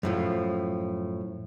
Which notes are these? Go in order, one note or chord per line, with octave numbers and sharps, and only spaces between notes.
F#2 A2 F3